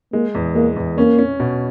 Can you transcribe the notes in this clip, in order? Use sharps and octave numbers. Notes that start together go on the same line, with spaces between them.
G#3 A#3
E2
G#3 A#3
E2
A#3 C#4
C#4
B2